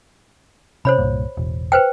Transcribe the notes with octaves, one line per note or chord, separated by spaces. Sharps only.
C3 C#4 C5 C#5 B5
C2 G2 A#2
E1 A1
B4 C5 G5